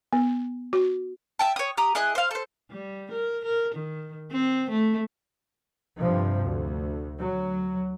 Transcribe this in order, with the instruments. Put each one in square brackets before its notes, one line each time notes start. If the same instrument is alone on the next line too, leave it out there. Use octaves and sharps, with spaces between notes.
[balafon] B3
F#4
[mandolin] E5 G5 A5
C#5 D#6
G4 A#5 D#6
E4 G#4 D#5 F#6
C5 F5
A4 C5
[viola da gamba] G3
A#4
A#4
D#3
C4
A3
[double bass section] G2 C3 F3
D2
F#3